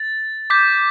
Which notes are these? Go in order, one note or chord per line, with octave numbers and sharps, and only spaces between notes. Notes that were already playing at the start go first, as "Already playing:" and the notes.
Already playing: A6
D6 G6 B6